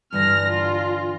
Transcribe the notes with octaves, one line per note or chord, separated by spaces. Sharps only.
G2 D3 E3 F6 A#6
F4